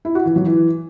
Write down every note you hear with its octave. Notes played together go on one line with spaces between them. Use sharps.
E4
F#4
E3
F#3
E3